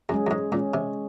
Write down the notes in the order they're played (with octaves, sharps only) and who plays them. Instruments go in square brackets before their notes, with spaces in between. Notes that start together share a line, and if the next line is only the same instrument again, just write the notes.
[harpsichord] F#2 [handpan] G#3 C#4 G#4
[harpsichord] F#2
G#2
[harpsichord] A#2 [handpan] G#3 C#4 G#4
[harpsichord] C3